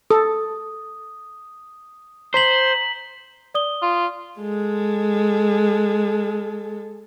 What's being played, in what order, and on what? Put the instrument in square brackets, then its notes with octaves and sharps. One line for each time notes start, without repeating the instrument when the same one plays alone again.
[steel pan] A4 [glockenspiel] D#6
[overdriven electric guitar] C5 [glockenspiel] A#5 B6 F#7
[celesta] D5 D#6 G7
[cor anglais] F4
[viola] G#3 A4